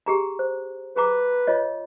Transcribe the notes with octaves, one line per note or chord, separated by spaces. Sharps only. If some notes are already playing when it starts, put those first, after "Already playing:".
G4 G#4 A#5
C5
G#4 B4 A#5 D6
F4 C#5 D#5